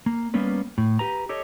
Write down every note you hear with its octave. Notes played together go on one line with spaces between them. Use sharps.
A#3
G3 A#3 B3 C#4 B4
A2
G4 B4 A#5
G4 A4 C#5 D#5